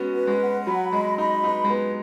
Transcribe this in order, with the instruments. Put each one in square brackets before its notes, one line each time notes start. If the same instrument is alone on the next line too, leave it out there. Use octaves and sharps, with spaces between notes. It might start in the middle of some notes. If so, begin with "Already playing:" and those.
Already playing: [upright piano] G#3 B3 C#4 [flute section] F#4
[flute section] B4
[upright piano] G#3
[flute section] F#5
[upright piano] F#3 [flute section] B5
[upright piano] G#3 [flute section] D#5
[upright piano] D#4 [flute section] B5
[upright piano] D#4 [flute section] B4
[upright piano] G#3
[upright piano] B3 [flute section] B4